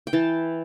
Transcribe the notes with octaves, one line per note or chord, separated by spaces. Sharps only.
G5
E3 A5